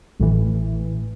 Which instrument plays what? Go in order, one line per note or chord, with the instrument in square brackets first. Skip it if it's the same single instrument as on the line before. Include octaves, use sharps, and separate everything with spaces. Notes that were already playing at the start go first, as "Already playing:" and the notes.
[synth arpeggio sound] A1 A2 E3